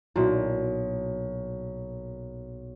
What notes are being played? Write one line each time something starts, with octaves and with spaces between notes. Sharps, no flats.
B1 A#2 E4 F#4 E5